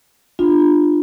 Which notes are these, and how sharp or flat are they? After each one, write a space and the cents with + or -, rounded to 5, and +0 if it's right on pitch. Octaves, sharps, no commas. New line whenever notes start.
D4 +30 F4 +0